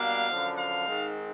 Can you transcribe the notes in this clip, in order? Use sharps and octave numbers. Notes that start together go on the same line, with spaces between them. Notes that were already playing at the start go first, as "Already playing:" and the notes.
Already playing: B2 G3 A#3 D4 F5
F#2 D3 F3
F5
G#2 D#3 G#3 C4